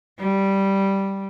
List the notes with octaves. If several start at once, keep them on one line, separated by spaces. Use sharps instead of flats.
G3